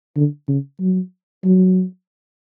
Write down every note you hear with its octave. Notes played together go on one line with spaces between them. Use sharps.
D3
C#3
F#3
F#3